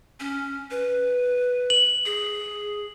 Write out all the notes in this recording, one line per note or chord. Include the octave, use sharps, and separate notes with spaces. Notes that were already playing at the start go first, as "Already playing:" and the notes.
C#4
B4
F#7
G#4